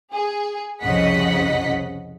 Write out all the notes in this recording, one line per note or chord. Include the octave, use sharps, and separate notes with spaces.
G#4
C2 F2 C#3 D#5 F#5 B6